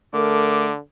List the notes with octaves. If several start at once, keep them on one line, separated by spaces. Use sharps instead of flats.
D3 A3 A#4 D6